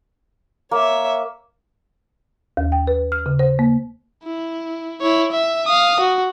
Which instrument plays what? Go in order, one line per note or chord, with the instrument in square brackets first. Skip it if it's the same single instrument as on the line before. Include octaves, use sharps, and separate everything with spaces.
[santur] A#3 [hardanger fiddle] C#5 E5
[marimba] D#2
G5
B4
F6
C#3
C5
A#3
[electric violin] E4
E4 C#5
E5
F5 D#6
F#4